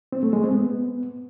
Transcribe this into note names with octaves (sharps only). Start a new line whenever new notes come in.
C4
A3
G#3
C4
B3